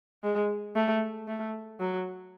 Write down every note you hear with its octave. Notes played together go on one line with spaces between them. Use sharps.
G#3
A3
A3
F#3